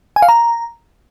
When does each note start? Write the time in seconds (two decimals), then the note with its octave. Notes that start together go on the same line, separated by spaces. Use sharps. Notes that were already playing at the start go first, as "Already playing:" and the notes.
0.16 G#5
0.22 F5
0.29 A#5